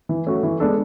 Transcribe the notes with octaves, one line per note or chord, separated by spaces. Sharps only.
E3
A3 C#4 F#4
E3
G#3 B3 D4 A4